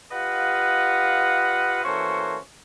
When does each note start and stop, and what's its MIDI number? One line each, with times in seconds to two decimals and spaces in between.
0.11 1.84 65
0.11 1.84 67
0.11 1.84 71
0.11 1.84 75
0.11 1.84 77
0.11 1.84 78
1.84 2.37 52
1.84 2.37 58
1.84 2.37 61
1.84 2.37 66
1.84 2.37 69
1.84 2.37 72